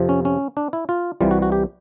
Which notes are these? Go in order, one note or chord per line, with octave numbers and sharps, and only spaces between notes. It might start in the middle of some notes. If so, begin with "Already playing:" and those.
Already playing: F2 C3 F3
C#4
C#4
D4
E4
F4
C2 C3 E3 G3 F4
F#4
F#4
G4